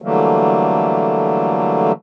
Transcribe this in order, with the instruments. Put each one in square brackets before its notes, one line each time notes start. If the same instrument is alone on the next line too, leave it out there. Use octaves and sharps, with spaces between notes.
[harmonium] D3 E3 F#3 G3 A3 A#3